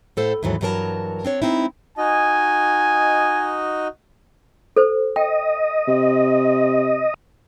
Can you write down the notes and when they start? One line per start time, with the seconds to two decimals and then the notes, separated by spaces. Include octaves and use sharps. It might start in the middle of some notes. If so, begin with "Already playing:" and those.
0.17 A2 A4 C5 F5
0.43 D#2 G#2 E3 F#3 A4
0.61 G2 E3 F#3 A4 A#4 A5
1.25 C4 D4 C#5
1.42 G#3 C4 D#4 E4
1.98 D#4 F#4 D#5 G#5
4.76 A4 C5
5.16 D#5 G5
5.88 C3